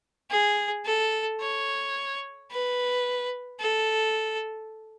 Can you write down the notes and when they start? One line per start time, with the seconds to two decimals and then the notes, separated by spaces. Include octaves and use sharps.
0.31 G#4
0.86 A4
1.41 C#5
2.51 B4
3.60 A4